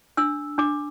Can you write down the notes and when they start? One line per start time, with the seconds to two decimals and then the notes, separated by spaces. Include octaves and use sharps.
0.17 D4 E6
0.58 D4 D6